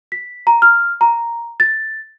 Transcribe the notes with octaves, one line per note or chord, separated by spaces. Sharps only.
B6
A#5
F6
A#5
A6